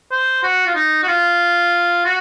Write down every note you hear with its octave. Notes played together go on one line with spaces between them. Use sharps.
C5
F#4
F4
D#4
F#4
F4
F#4